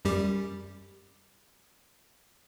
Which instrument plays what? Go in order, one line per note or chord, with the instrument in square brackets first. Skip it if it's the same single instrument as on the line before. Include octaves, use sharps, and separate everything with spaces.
[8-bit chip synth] F#2 G3 G4